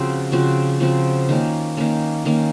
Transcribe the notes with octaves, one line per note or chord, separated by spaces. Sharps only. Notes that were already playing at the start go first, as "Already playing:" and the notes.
Already playing: C#3 F3 C4 F#4
C#3 F3 C4 F#4
C#3 F3 C4 F#4
D#3 A#3 C#4
D#3 A#3 C#4
D#3 A#3 C#4